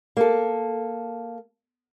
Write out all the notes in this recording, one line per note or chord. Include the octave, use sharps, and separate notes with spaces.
A#3 A4